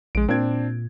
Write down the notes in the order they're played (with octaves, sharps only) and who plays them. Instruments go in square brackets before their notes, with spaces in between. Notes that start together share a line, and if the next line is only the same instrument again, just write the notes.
[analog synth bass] A#1 [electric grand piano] G#3 D7
[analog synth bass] A#2 [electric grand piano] C4 D4 G#6